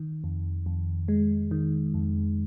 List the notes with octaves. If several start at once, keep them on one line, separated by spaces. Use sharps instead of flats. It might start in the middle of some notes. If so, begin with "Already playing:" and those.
Already playing: D#3
F2
F2
G#3
D#3
F2